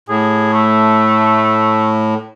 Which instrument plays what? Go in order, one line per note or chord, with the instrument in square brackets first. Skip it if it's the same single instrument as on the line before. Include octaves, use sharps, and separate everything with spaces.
[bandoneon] A2 [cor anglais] G#4
[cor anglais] A3